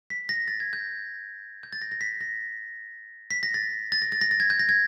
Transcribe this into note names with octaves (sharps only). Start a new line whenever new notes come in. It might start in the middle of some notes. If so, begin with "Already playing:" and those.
B6
A#6
A6
G#6
G6
G6
A6
A#6
A#6
B6
A#6
B6
A#6
A6
A6
A#6
A6
A#6
A6
G#6
G6
A#6
G#6